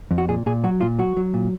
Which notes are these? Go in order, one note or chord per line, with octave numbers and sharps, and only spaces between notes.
F2
F#4
A#2 G#4
A#2 G#4
F#3 F#4
A#2 F4
F#3 F#4
F#3
A#2